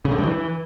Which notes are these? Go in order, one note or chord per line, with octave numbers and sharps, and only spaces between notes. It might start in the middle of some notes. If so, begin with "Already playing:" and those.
C#3
D3
G2
E3